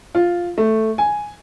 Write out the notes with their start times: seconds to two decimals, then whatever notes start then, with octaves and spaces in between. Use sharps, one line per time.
0.15 F4
0.58 A3
0.98 G#5